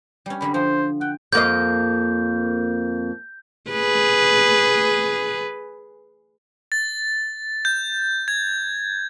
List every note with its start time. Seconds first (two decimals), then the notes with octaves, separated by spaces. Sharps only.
0.26 G3 C#4
0.41 F#2 D3 G3 B5
0.54 F3 C5
1.01 F#5 G5
1.33 F2 A#3 D#5 G6
3.71 G#4 B4
6.72 A6
7.65 G6
8.28 G#6